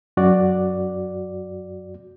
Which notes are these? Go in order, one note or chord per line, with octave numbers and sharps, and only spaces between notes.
F#2 F#4 D5